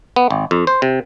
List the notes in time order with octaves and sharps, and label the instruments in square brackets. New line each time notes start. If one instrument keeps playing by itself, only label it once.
[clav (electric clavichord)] B3
G#1
F2
C5
C3